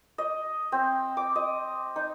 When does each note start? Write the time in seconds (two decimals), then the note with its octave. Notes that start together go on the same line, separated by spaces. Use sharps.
0.18 D#5
0.72 C4
1.17 D6
1.36 D#5
1.96 D#4